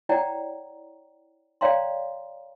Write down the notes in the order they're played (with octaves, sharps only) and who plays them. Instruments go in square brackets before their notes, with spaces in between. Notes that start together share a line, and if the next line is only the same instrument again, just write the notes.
[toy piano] E4 C#5 D5 F#5 G5 A#5
C#5 D5 F5 G5 A#5 C6